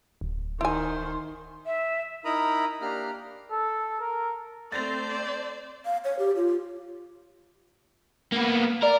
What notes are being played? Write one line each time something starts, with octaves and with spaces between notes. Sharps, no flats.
D1
D#3 E4 C5 G#5
E5
D#4 E4 A#4 A#5 B5 D#6
A#3 D4 G4 A#5 F6
A4
A#4
A3 C4 C5 D5 A6 A#6 F7
F5
C#5
G4
F4
A#3 B3
A#4 D5